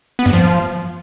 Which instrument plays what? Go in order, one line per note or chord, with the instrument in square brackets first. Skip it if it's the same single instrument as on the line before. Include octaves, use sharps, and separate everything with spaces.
[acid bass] B3
G2
F3